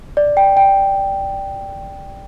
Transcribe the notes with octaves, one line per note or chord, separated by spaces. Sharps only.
D5
G5
G5